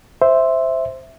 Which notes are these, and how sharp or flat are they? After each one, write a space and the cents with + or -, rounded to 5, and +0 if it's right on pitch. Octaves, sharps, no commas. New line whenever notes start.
C5 +0 E5 +0